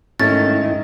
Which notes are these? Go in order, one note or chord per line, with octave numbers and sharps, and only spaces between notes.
G#2 D#3 A3 C#4 E4 A6